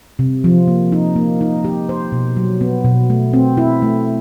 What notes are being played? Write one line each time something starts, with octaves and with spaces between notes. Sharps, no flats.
C3
F3
A#3
D#4
A#3
D#4
G4
C5
B2
F#3
B3
B2
A3
C4
E4
A3